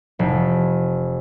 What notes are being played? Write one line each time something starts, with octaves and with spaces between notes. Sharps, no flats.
F1